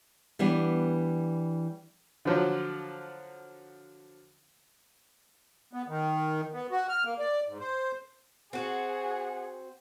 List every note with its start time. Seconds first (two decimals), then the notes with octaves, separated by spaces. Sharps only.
0.39 E3 G3 B3 D4
2.25 D3 F3 F#3
5.73 B3
5.88 D#3
6.53 B3
6.71 F#4
6.89 F6
7.05 A#3
7.19 D5
7.48 G#2
7.60 C5
8.53 C4 F#4 G#4 F#5